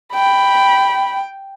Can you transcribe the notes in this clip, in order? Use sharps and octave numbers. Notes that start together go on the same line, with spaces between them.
G5 B5